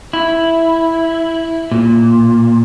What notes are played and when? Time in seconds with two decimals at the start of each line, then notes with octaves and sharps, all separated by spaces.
0.13 E4
1.71 A#2